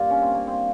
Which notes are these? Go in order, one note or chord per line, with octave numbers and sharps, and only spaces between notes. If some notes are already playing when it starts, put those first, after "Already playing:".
Already playing: G2 A#3 F4
C#4
C4
A#3
C4